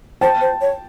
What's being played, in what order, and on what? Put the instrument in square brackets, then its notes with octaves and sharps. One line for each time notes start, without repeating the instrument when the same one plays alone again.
[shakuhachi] C5 [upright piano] G5 A5
[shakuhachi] C5
C#5